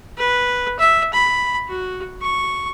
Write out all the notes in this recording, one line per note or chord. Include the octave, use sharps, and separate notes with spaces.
B4
E5
B5
F#4
C#6